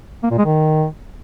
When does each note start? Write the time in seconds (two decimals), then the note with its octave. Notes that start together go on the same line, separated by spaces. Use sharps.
0.23 A#3
0.31 A#2
0.38 G#3
0.45 D#3